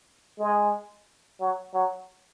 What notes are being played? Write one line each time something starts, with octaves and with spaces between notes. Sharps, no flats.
G#3
F#3
F#3